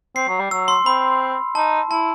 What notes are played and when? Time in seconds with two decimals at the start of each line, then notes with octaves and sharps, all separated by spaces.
0.16 C4 C7
0.28 F#3
0.39 G3
0.51 F#3 E6
0.68 C6
0.86 C4 B5
1.55 D#4 A5
1.90 E4 A5